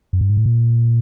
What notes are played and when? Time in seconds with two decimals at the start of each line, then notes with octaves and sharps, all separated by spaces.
0.13 F#2
0.21 G2
0.29 G#2
0.37 A2
0.46 A#2